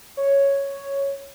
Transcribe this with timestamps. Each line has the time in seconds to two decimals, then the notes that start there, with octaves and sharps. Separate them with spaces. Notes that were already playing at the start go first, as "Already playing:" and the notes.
0.17 C#5